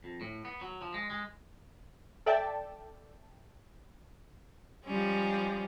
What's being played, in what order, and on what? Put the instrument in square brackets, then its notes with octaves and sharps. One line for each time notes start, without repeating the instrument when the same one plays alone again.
[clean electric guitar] F2
A2
B3
F#3
F3
G#3
G#3
[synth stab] A4 D5 E5 G5 A5
[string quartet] F3 G3 G#3 C#4